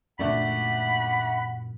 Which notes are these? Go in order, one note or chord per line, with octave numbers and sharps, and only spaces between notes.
F#2 A#2 D3 A3 D4 F#5 B5